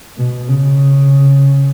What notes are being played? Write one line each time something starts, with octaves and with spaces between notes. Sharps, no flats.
B2
C#3